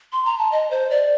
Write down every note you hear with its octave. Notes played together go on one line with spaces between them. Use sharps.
C6
A#5
A5
D#5
C5
D5